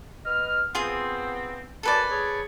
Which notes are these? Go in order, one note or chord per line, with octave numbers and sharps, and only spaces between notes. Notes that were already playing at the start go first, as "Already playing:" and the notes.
B3 D#5 F6
B3 C4 F4 G#4
F#2 A4 B4 D5 G#5 A5
G#4 C#5